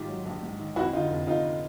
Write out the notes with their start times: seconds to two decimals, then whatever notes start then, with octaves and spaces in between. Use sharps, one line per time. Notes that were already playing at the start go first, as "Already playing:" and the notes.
Already playing: G#2 D#3 F4 G4
0.08 F#3
0.26 A#1
0.42 G#2
0.59 D#3
0.76 F2 E4 F#4
0.93 D3 D#4 F4
1.10 F1
1.27 F1 D#4 F4